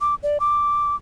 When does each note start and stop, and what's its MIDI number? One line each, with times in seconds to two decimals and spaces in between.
0.01 0.15 86
0.23 0.38 74
0.40 0.96 86